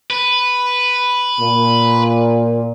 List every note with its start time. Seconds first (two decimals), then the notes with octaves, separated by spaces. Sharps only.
0.10 B4
1.39 A#2